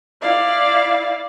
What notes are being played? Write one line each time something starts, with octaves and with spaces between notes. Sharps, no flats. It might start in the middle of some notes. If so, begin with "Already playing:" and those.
E4 D5 F5